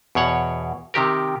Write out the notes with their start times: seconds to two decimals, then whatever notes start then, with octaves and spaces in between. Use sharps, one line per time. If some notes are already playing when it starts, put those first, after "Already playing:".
0.15 E2 B2 C#5 F#5
0.94 C3 D#3 G4 A#4